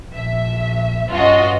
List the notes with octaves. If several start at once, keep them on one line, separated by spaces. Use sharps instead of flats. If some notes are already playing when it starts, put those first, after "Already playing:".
A#1 E5
G2 C#4 F4 F#4 D#5